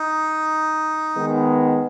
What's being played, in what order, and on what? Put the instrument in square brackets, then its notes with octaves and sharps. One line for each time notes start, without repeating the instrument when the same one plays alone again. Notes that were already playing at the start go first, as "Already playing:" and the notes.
Already playing: [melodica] D#4
[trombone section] D#3 G#3 B3